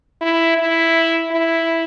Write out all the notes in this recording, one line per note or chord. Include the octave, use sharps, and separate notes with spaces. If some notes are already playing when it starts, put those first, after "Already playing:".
E4
E4
E4